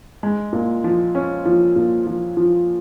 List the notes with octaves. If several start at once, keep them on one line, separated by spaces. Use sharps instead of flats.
G#3
A#2
F3
C#4
F3
A#2
F3
F3